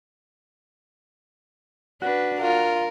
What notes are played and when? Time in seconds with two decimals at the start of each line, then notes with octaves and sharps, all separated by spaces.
2.02 D4 F#4 B4
2.41 F4 A#4